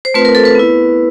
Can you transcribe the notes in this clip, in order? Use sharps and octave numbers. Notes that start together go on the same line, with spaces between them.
C5
A3 C4 F4 B4
A#4
A4
B4
B3 E4